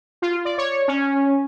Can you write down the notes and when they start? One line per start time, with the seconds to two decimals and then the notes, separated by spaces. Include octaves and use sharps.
0.22 F4
0.45 D5
0.58 C#5
0.88 C#4